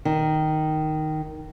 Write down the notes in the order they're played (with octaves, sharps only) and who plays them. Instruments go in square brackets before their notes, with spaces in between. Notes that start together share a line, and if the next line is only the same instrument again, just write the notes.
[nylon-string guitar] D#3